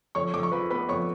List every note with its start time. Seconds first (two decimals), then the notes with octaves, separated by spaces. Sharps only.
0.15 F2 C#5 C#6
0.34 F2 D6
0.43 C#6
0.52 F3 B4 B5
0.70 B3 B4 B5
0.89 F2 C#5 C#6